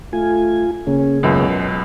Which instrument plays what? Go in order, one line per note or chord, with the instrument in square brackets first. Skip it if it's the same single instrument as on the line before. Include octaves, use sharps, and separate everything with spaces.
[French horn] A3 [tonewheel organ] F4 G#5
[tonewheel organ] C#3 A#3 G#4 [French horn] C#4
[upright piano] C#2 F#2 B2 [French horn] C#4